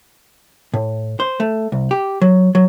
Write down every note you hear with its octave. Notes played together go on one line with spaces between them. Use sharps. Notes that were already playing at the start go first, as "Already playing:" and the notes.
A2
C5
A3
C2
G4
F#3
F#3